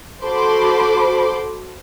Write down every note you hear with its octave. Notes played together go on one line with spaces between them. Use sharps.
F#4 A4 C5 B5 C6 D6